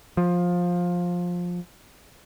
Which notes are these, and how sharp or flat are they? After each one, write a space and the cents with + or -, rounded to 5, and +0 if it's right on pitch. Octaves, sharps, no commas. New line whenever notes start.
F3 +15